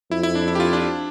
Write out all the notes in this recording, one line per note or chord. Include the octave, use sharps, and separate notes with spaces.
F2 E4
E4
D4
E4
G4
F4
D4